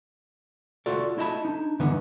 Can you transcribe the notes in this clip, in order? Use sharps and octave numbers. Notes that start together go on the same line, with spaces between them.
F4 F#4 A4 D5
E4 D#5 A5 B5
D4 D#4
G2 D3 E3 B3 D#4